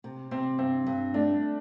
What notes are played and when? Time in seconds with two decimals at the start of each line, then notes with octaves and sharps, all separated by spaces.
0.04 C3
0.31 C3 C4
0.58 G2 C4
0.86 G2
1.14 A3 D4